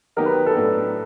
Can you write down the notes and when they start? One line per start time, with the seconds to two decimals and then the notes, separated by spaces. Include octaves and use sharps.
0.16 D#3 F#3 B3 D#4 G4 A#4
0.26 B4
0.47 A4
0.55 A2 F#3 B3 D4